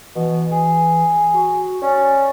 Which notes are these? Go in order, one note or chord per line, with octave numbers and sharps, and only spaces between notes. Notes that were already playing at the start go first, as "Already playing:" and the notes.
B2 E3
G#4
F#4
C#4 D5